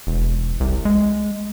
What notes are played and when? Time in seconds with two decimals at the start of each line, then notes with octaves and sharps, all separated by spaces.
0.07 E1
0.60 C2
0.85 G#3